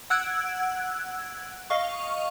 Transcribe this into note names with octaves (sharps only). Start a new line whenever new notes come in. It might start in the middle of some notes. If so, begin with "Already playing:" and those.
F#5 E6 F#6 G#6 D7
D#5 F5 C#6